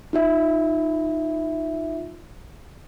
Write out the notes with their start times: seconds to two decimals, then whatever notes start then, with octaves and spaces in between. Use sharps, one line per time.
0.13 D#4 F4 E5